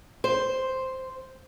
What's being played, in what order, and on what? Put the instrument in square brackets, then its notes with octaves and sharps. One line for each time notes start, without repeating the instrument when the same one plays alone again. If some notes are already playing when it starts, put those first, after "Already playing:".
[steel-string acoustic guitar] C5